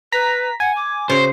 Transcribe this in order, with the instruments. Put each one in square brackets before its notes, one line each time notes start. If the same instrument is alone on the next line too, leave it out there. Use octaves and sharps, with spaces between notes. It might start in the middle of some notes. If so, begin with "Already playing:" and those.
[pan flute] B4 [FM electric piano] A#5 B6
[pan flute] F#5 [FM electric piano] G#5
[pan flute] D6
[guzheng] C#3 C#5 [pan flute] F#4 [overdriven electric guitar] C5 [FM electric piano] G6